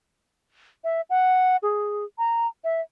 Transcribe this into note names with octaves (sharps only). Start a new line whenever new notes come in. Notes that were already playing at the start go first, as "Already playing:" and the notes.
E5
F#5
G#4
A#5
E5